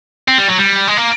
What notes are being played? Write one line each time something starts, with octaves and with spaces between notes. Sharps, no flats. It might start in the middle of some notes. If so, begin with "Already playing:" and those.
C4
G3
F#3
G3
G#3
A#3